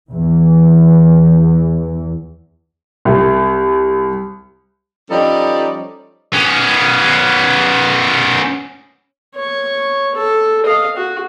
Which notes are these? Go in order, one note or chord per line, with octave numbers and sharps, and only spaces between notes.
E2 E3
C2
F3 G3 C#4 D#4 A4 D5
B3 C#4
C#5 C#6
A4
D#5 F5
F#4